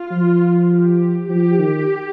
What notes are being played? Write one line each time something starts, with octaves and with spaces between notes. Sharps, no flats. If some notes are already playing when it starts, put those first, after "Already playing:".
Already playing: F4
F3
G4
F3 G4
D#3